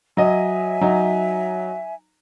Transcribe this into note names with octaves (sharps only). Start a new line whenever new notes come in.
F#3 D#5 E5 G#5
F#3 D#4